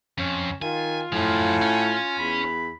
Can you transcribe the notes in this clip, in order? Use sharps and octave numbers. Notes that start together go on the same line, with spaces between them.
F2 C#4
D#3 F4 G#5
F#2 A2 F3 G#5
C#4
E2 B5